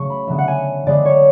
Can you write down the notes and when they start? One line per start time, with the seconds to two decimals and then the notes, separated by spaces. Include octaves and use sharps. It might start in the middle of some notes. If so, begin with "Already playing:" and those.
Already playing: C#3 F#3 A3 C#6
0.10 B5
0.28 D3 F#3 B3 E5
0.38 F#5
0.48 G#5
0.86 D3 G#3 B3 D5
1.05 C#5